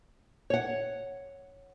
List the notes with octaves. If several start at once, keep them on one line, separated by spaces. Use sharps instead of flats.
C#5 F#5